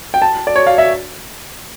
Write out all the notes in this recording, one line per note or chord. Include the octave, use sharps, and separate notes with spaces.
G5
A5
D5
C#5
F5
E5